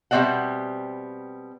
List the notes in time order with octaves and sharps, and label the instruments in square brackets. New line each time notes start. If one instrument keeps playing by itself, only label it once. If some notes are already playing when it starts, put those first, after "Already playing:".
[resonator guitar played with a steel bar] B2 G3 C4 D5 E5 F#5